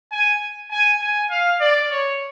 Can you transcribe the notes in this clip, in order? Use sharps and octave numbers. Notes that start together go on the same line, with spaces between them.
G#5
G#5
G#5
F5
D5
C#5